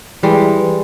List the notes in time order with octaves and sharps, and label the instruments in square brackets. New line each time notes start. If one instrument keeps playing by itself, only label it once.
[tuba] E3 [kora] G3 G#3